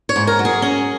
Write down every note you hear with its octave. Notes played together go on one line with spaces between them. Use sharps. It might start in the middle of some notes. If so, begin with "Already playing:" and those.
C#5
G#2
A#4
F#3
G#4
C#4